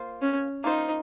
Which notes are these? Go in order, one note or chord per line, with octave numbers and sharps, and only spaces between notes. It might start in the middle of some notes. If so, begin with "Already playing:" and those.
Already playing: A#3 F4 C5
C#4
A#3 D#4 F4 C5